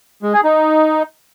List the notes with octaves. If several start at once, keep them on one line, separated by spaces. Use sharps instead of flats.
G#3
G#4
D#4